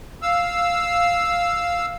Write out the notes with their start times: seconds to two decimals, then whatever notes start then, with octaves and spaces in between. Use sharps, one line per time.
0.22 F5 E6